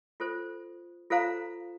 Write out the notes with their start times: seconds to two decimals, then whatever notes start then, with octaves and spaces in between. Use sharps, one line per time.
0.20 F4 A4 C5
1.10 F4 A4 C5 F5 A#5